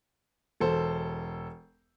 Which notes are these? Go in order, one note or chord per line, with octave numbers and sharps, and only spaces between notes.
E1 A4 C5